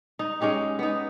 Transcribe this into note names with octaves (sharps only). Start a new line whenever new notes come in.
D#4
G#3 C#4 D#4 G4
B3 D#4